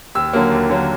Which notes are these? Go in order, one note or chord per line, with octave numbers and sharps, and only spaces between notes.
D#2 E6
D3 F#3 A#3
D#2
D3 F#3 A#3